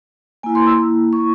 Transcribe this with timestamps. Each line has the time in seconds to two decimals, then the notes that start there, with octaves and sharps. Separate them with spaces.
0.43 A#3 E4 G#5
0.55 C6
0.67 E6
1.13 C#6